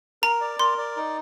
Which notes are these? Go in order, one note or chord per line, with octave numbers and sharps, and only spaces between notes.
A#4 A#5
D5
A#4 C6
D5
D#4